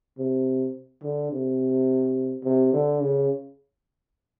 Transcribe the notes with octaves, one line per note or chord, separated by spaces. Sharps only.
C3
D3
C3
C3
D3
C#3